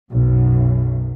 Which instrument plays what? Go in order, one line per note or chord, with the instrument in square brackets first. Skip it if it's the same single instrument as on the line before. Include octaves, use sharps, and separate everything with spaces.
[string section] B1 F#2